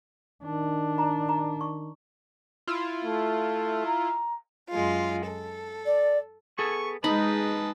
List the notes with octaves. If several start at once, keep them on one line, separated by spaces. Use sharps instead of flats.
D#3 D4
A#5
A#5
C#6
E4 F4
A3
A#5
F#2 G#3 F4
A4
D5
B3 G#4 A4 C#6
G#3 D#4 B4 D#5 A5 B5